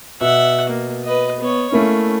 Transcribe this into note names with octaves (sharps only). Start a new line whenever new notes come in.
B2 E5 F#5
A#3
B4 D#5
B3 C#5
A3 A#3 C#4 E4